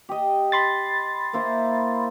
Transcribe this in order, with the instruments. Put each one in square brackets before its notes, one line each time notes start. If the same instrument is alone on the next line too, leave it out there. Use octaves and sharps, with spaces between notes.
[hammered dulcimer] G4 D#5
[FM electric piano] B5 C6 A6
[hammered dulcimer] A#3 E4 C5